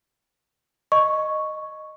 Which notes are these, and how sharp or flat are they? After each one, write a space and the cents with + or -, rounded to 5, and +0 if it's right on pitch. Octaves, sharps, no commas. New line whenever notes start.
D#5 -10 C#6 +0